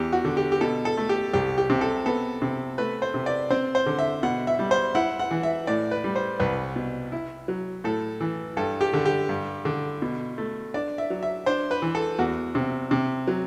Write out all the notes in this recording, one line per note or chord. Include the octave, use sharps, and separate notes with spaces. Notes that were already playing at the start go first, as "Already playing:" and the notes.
Already playing: E2 G4
F#4
D3
G4
G4
B2 A4
A4
A3
G4
C2 G4
G4
C3
A4
B3 A4
C3
A3 B4
C5
C3
D5
C4 C5
C5
D3
E5
B2 F#5
E5
G3
C5
E4 F#5
F#5
E3
E5
A2 D5
B4
G3
C5
C2 B4
B2
E4
F#3
A2 A4
E3
G2 A4
G4
D3
G4
G2
D3
B2
A3
D4 D5
E5
F#3
E5
D4 C5
B4
E3
A4
E2 F#4
C3
C3
F#3